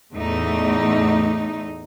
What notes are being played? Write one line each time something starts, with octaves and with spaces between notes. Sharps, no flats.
E2 A2 A3 D#4